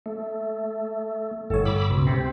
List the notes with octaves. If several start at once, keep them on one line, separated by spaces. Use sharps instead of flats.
A3
G1 A2 A4 C#5
B5 D6 E6
C#2 B2
C3 C4